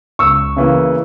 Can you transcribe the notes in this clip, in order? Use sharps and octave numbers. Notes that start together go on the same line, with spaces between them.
C#2 C#6 E6
C#3 E3 A#3